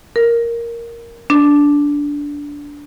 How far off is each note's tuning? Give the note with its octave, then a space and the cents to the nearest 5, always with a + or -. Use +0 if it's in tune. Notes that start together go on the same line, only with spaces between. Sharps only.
A#4 +0
D4 -15